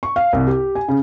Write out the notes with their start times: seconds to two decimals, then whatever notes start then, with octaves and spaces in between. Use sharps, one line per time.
0.03 C#6
0.16 F5
0.33 C2
0.47 G4
0.75 G#5
0.88 C#3